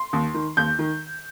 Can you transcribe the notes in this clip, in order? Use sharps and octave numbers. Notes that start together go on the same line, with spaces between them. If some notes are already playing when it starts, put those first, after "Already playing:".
Already playing: C6
D#2
D#3
D#2 G6
D#3